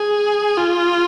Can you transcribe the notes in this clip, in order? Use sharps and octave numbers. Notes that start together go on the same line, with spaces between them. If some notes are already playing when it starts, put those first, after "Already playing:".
Already playing: G#4
F4